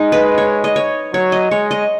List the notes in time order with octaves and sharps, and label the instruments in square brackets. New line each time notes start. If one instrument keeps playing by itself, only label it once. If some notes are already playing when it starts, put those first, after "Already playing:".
Already playing: [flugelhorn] G#3 [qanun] D#4
[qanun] B4
C#5
D#5
C#5
[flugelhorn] F#3 [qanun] C#5
[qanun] D#5
[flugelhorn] G#3 [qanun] C#5
[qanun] D#5